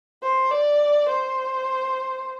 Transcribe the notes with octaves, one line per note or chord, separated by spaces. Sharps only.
C5
D5
C5